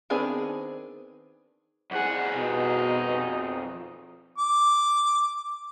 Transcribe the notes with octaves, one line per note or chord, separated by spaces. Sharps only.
D#3 B3 C4 D4 G#4
F2 G#4 F#5
B2 D#4
D6